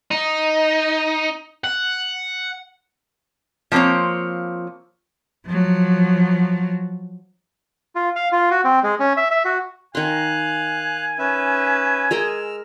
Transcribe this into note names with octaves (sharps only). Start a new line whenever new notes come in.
D#4
F#5
F3 A#3 C4 C5 C#5
F3 F#3
F4
F5
F4
F#4
C4
G#3
C#4
E5
E5
F#4
D#3 F5 G#5 C6 F#6
C#4 B4 E5
G#3 A#4 D#5 E6 F6